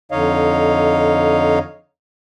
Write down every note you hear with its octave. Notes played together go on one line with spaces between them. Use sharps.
F2 D3 D#4 C#5 D#5 F5